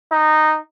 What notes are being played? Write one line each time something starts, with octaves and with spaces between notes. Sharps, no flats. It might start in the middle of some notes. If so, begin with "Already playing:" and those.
D#4